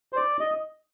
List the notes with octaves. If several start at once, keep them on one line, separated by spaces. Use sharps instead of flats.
C5
D5
D#5